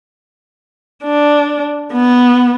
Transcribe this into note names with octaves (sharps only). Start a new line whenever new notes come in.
D4
B3